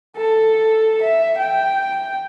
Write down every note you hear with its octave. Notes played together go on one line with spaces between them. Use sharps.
A4
E5
G5